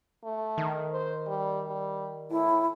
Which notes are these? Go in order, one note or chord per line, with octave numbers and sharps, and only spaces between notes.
A3
D#3
C5
G3
G3
A2 E4